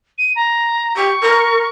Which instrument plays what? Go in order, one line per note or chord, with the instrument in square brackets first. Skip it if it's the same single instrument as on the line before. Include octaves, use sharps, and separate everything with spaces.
[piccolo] D#7
A#5
[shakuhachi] G4 [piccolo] C#6
[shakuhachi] A#4